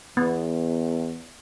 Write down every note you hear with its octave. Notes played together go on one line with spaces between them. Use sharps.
E2 B3